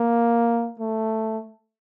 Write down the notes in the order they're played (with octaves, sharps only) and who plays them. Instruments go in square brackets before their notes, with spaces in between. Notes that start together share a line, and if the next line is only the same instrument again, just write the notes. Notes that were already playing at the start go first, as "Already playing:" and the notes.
Already playing: [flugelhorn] A#3
A3